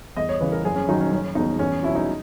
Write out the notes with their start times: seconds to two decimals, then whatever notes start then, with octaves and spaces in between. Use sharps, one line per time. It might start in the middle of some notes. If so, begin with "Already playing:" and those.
0.17 E2 D#5
0.29 C#5
0.41 C#3 E3 B4
0.52 A#4
0.64 F#1 G#4
0.76 C#4
0.88 F#2 D#3 F#3 D#4
1.01 C#4
1.12 F#1 C#4
1.35 E2 B2 D#4
1.59 E2 C#4
1.83 B2 F#3 E4
1.95 D#4